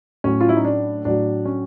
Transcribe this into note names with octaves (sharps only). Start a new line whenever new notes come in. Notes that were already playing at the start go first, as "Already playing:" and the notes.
A2 F#3 C#4
F4
E4
D#4
D4
A2 F#3 D4
C#4